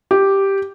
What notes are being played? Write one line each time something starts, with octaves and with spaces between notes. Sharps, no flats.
G4